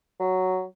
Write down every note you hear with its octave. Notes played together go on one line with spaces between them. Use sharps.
F#3